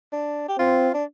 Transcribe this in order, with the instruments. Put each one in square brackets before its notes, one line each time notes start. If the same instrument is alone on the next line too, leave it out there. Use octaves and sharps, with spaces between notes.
[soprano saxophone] D4
G4
[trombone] C4 [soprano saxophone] F4
[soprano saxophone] D4